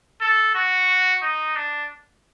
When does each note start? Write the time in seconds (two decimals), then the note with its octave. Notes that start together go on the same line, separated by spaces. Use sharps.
0.21 A4
0.55 F#4
1.22 D#4
1.56 D4